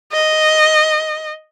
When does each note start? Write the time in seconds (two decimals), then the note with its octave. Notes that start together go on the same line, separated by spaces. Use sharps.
0.13 D#5